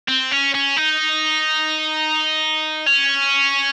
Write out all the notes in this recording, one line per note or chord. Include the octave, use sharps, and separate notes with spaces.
C4
C#4
C#4
D#4
C#4